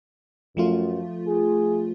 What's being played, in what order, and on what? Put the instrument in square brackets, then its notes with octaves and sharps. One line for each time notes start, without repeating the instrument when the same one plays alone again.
[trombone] F#2 [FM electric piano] F3 A3 F4
[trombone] G#4